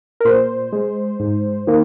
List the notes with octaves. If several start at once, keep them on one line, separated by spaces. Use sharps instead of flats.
A#4
A#2 C5
G#3
G#2
D#3 A#3